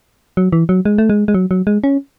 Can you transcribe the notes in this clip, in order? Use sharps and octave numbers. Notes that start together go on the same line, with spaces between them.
F#3
E3
F#3
G#3
A3
G#3
G#3
F#3
F#3
G#3
C#4